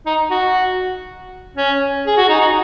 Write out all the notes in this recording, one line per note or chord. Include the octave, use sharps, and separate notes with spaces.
D#4
F#4
C#4
G#4
F#4
D#4
F#4